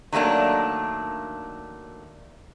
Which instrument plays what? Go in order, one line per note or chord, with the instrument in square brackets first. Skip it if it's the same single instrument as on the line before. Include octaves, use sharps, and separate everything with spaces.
[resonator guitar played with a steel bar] D#3 F#3 A3 A#3 D4